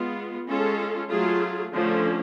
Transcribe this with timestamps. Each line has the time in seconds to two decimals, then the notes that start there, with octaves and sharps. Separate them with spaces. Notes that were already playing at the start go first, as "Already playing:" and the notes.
Already playing: G#3 B3 F4
0.47 G#3 C#4 F4 A4
1.10 F#3 A3 F4 G#4
1.72 D3 F3 A3 C#4